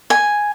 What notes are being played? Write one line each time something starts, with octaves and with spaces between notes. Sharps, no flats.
G#5